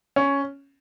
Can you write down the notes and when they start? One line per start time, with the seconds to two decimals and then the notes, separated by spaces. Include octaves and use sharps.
0.16 C#4